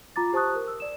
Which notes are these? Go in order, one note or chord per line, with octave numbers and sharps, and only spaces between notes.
F4 A#5 D6 A6
G4 C5 A5 C#6 D#6 F#6
A#4
E6
D5 E7